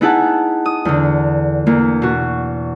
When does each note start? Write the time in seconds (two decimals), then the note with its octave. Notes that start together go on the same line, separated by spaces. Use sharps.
0.01 B3 D#4 E4 G#4 F#5 A5
0.66 D#6
0.85 E2 D3
1.66 E2 A#3
2.02 B2 F#4